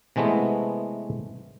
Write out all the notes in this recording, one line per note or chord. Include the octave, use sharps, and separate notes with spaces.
C3 E3 G#3 A3 B3